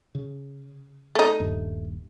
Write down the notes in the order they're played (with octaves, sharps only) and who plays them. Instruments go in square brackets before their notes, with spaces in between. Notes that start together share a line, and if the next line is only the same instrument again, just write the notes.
[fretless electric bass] C#3
[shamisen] A3 D#4
[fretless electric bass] D#1 G2